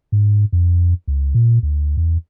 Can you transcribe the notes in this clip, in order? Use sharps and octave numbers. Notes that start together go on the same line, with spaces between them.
G#2
F2
C#2
A#2
D2
E2